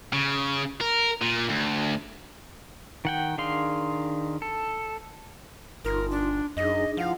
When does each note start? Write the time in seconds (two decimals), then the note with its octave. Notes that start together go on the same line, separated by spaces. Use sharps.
0.13 C#3
0.81 A#4
1.22 A#2
1.50 D2
3.05 D#3 F#5 G5
3.38 D#3 D4 G#4 F5 C6
4.42 A4
5.85 G1 D#4 F4 A#4 C6
6.11 D4
6.57 F#2 D4 D#4 G#4 D#5
6.97 F3 E4 F4 F5 F#5